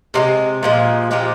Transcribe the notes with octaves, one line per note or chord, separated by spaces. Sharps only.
C3 D#3 G#3
A#2 F3 G#3
A#2 F3 G#3 G4